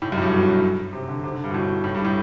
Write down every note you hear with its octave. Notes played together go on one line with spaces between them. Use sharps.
A2
F#2
A2
G2
B2
A2
F#2
C3
D3
C3
D3
G2
B2
A2
A2
G2
A2